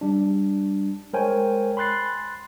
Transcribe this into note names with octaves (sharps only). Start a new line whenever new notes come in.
G3 D4
G#3 A#4 C5 C#5 G5 G#5
B5 C6 F#6 A6 C7